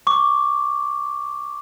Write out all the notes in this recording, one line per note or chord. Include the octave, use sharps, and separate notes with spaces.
C#6 D6